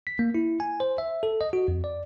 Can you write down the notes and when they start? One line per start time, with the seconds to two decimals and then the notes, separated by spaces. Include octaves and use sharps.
0.07 B6
0.19 A#3
0.35 E4
0.60 G#5
0.80 C5
0.98 E5
1.23 A4
1.41 D#5
1.53 F#4
1.68 F2
1.84 D5